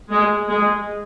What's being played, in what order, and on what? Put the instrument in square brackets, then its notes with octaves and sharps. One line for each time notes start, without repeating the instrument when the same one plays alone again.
[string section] G#3
G#3